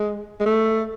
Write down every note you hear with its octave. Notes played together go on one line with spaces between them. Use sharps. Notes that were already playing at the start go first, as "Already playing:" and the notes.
Already playing: G#3
G#3
A3